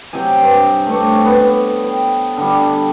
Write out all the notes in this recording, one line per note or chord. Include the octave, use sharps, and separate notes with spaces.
C3 F#3 D#5 G#5
G2
A3 C4 D4 C#5
B3
G5
D3 G3